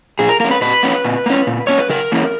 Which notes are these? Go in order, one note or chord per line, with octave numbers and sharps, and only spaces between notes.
A#2 G#4
A#4
A#3 C#4 A#4
B4
A#2 B4
A#3 C#4
A#2
A#3 C#4
A#2
A#3 C#4 C#5
B4
C#3 A#4
E3 A#3 C#4